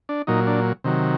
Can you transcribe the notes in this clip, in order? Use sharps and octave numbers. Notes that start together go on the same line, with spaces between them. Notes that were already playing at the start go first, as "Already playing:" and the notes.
D4
A#2 F#3 D#4
D4
C3 D#3 F#3